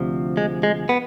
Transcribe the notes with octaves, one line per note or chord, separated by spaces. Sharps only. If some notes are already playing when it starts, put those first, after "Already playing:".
Already playing: D2 C3 F3
G#3
G#3
B3